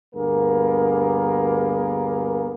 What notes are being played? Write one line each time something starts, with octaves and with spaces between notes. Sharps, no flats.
D2 G2 A#3 B3 G#4 A#4